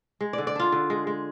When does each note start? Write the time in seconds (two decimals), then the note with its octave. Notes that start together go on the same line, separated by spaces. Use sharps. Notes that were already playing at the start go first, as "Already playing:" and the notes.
0.21 G#3
0.33 D3 D5
0.47 D5
0.56 D4 F4
0.72 D3
0.90 G#3
1.07 G#3